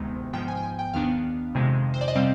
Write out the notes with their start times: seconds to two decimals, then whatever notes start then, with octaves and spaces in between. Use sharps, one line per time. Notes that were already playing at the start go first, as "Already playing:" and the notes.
Already playing: D2 C3 D#3 G#3 B3
0.33 G#2 F3 B3 G5
0.48 G#5
0.57 G5
0.63 G#5
0.79 G5
0.94 D#2 D#3 B3 D4 F5
1.55 F2 C3 D#3 G#3
1.94 C5
2.01 D5
2.08 D#5
2.15 C3 G3 C4 F5